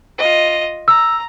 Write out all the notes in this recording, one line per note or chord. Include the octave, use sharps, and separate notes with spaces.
F4 D#5
A#5 E6